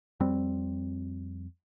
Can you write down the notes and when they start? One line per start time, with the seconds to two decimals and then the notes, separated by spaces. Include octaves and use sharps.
0.20 F2 G3 C4